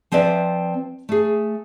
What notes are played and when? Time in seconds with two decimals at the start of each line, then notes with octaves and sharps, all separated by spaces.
0.12 F3 C4 B4 D5 E5
1.09 A3 G#4